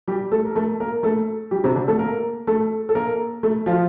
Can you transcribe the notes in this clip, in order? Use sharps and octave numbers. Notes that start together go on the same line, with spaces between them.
G3 G4
A3 A4
A#4
A3 A4
A#3 A#4
A3 A4
G3 G4
C3 C4
D3 D4
A3 A4
A#3 A#4
A3 A4
A4
A#3 A#4
A3 A4
F3 F4